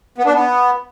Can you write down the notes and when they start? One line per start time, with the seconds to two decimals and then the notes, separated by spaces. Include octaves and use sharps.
0.18 B3
0.26 D4
0.33 B3